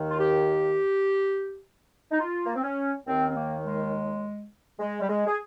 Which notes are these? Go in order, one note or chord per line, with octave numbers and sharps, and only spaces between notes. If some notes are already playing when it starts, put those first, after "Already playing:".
Already playing: D#2 D#3
F4
G4
D#4
F4
A#3
C4
C#4
D#2 D#3 C4
C4
A#3
G#3
G#3
G3
G#3
G#4